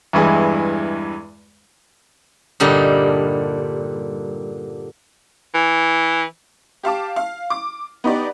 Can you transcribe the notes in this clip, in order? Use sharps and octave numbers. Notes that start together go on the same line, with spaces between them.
E2 G2 E3 G#3
G2 A#2 D3 G3 D#4
E3
G4 F5 A5 D6
F5
D6
B3 D#4 G4 D5